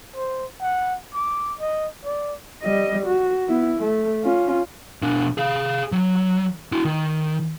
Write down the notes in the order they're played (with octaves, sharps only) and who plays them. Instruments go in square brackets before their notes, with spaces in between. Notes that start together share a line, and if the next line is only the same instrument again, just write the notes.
[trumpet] C5
F#5
D6
D#5
D5
[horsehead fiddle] G3 D#5
F#4
B3 E4
A3
C#4 F4
[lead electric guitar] B2 D4
G#4 F5
F#3
E4 F#4
D#3